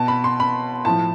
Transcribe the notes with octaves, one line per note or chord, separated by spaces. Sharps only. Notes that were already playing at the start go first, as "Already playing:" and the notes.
Already playing: B2 A5
B5
C6
B5
A2 F3 A5